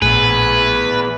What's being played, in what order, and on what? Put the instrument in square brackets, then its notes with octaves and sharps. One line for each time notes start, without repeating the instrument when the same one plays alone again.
[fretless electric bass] A#1 A2 [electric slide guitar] B3 G#4 [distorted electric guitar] B4